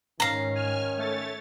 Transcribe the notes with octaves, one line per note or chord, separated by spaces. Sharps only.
G#2 D#3 C#4 F5 A#5
G#5 F6
A3 C#5 A6